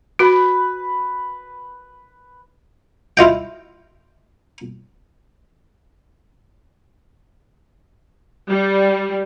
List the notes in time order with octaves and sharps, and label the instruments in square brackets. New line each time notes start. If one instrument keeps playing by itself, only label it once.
[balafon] F#4 [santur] B4 B5
[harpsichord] E4 F4 D#5 G5
[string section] G3